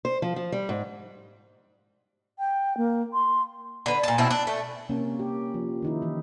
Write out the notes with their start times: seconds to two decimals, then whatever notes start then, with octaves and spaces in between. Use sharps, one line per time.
0.05 C5
0.22 F3
0.36 F3
0.52 G3
0.69 G#2
2.39 G5
2.77 A#3
3.14 C6
3.86 D3 B4
4.03 A#2 A5
4.18 B2 C4 E4
4.30 D4
4.47 A3
4.89 C3 A#3 C#4
5.19 G4
5.54 F3
5.82 D#3 D#4 E4
6.02 E3